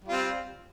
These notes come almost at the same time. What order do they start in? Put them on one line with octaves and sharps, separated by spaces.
G3 F4 C4